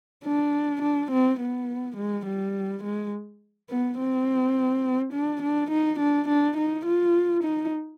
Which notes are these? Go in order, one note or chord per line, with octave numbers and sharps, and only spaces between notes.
D4
D4
C4
B3
G#3
G3
G#3
B3
C4
D4
D4
D#4
D4
D4
D#4
F4
D#4